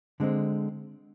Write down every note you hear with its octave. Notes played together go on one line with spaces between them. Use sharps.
D3 G#3 C4